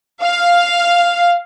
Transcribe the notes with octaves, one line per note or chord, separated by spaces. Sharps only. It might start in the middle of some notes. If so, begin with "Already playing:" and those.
F5